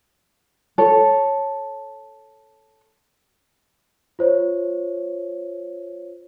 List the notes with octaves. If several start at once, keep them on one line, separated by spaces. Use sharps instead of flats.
A4 C#5
F4 C5 C#5